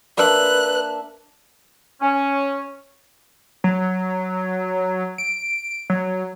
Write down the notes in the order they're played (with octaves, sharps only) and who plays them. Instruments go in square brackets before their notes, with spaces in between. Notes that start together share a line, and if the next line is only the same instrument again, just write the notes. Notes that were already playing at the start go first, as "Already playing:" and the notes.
[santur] A#3 D4 E5 [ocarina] B4 [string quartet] F#6
[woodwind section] C#4
[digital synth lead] F#3
D7
F#3